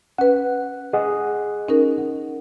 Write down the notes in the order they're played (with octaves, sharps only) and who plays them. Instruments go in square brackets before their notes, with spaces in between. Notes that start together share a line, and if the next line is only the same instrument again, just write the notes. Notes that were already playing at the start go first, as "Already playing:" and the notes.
[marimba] C#4 B4 [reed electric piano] F#5
[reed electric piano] G#4 D#5 F#5
[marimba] C#4 D#4 A#4